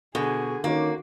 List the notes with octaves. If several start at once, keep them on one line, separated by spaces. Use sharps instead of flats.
B2 D3 G#4 G#5
D#3 A#3 C#4 F#4